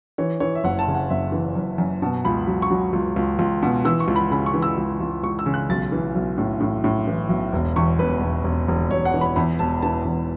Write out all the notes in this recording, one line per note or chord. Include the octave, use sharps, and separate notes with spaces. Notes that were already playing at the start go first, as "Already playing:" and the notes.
E3 C#5
E3 C#5
E5
F#1 F#5
A5
C#3
F#5
F#1 E5
E3
F#2
F#2
B2 A5
C#2 B5
F#3
C#6
F#3
C#2
C#2
C#2
B2
E3 E6
C#6
C#2
B5
C#3 B5
C#6
E3
E6
C#2
C#2
C#2 C#6
E6
C#3
F#6
B1 A6
E3
B1
A2
A2
A2
E3
B1
E1
E2 C#6
E1 B4
E1
E1
E1
E1 C#5
F#5
E3
B5
E2 B5
E1 A5
E3 A5
E2